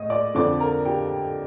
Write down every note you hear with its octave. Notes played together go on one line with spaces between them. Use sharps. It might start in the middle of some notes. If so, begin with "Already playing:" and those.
Already playing: A2 D#5 D#6
D5 D6
F2 D3 F3 D5 D6
A#4 A#5
G4 G5